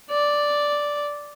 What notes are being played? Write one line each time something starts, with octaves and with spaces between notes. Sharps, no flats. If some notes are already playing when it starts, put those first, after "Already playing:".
D5